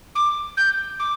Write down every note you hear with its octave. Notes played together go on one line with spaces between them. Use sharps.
D6
G6
D6